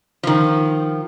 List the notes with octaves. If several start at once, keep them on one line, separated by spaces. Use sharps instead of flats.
D#3 F3